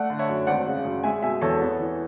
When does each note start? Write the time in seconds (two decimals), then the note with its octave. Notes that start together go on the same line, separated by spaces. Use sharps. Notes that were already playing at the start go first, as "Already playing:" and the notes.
Already playing: A3 D5 F#5
0.10 D3
0.19 C#5 E5
0.29 F#2
0.47 G#1 D5 F#5
0.67 C#3
0.85 F#2
1.04 G#3 E5 G#5
1.22 B2 E5 G#5
1.41 E2 A4 C#5
1.61 B3
1.79 E3